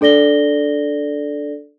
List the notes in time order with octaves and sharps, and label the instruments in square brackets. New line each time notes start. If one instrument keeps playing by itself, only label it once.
[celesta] D4 A4 D5 A#6 G7